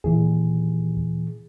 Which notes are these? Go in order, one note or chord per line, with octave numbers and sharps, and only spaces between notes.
D#2 A#2 E3 G#4